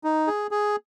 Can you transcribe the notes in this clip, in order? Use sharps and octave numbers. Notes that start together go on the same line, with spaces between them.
D#4
G#4
G#4